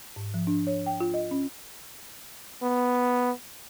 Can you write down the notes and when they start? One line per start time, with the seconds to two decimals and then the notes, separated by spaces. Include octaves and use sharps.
0.16 G#2
0.34 F3
0.47 D4
0.67 C#5
0.86 G5
1.00 F4
1.14 D#5
1.31 C#4
2.62 B3